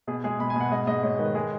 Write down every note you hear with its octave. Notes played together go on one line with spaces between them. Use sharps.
B2 G#4
G#3 G#4
B2 B5
G#5
B2 F#5
G#2 D#5
G#2 D#5
G#2 C#5
D#3 B4
G#3 G#4